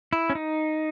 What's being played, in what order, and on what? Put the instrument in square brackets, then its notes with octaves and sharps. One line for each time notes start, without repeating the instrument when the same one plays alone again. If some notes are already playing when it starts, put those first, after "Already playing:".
[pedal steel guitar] E4
C#4
D#4